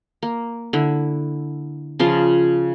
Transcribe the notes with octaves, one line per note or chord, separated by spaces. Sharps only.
A#3
D3 E4
C#3 F3 F4